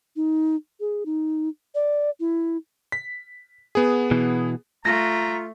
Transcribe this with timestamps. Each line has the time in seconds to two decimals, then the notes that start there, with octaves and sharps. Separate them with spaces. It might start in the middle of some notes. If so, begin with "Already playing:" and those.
0.16 D#4
0.80 G#4
1.06 D#4
1.75 D5
2.20 E4
2.92 B6
3.75 B3 G#4
4.11 B2 E3
4.85 A3 F4 A#5 A#6